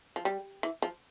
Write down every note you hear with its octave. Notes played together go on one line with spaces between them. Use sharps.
F3
G3
E3
F3